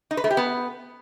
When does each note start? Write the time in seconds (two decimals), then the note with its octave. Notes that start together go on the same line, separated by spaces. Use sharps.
0.11 D#4
0.17 B4
0.24 A3
0.31 G4
0.37 B3